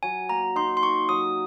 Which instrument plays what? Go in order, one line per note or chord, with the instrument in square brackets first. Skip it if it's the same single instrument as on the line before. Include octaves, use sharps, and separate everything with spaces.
[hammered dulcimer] F#3 [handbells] G#5
[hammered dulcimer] A#3 [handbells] A#5
[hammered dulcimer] D#4 [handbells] C6
[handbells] C6
[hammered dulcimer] A#4 [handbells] C#6
[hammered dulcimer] F#3 [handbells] D#6